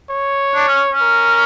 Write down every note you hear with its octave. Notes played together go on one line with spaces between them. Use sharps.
C#5
D4
C#4
C#4
A#4